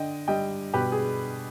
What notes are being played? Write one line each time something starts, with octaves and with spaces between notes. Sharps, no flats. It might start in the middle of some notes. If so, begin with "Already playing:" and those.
Already playing: D3 D#5 G5
G3 D#5 G5
B2 G4 B4
G#4